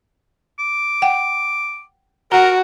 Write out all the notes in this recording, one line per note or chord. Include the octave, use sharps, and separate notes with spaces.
D6
F#5 G5
F#4 A#4 F#5 A#5